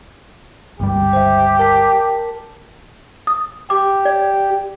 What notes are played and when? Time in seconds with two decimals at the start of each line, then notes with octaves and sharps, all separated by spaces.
0.80 G1 C#2 G3 G4
1.13 C5 E5
1.59 A#4 A5 B6
3.27 D#6
3.70 G4 D6
4.05 D5